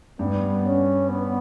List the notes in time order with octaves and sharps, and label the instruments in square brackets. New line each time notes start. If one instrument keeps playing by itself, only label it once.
[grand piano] G2 [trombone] B3
[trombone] C#4
B3